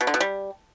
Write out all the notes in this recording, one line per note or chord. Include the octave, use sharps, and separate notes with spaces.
B2
D3
B2
G3